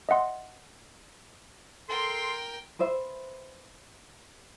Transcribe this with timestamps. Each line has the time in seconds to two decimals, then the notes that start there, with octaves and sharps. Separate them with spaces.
0.09 D#5 E5 F#5 C6
1.89 A4 A#4 G5 C6
2.79 B4 C5 E5